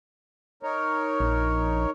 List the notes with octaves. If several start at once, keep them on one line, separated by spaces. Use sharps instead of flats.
D#4 A#4 C#5
A#1